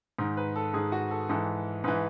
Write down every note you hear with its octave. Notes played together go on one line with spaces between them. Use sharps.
G#2 D#3
B4
A4
G#2 D#3 G#4
F#4
A4
G#2 E3 A4
G#2 E3 B4